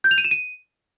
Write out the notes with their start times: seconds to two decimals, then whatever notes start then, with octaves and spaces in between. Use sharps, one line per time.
0.04 G6
0.11 F7
0.18 D#7
0.25 E7
0.31 D#7